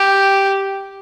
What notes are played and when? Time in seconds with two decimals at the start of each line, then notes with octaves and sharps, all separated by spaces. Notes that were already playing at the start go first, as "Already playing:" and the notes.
Already playing: G4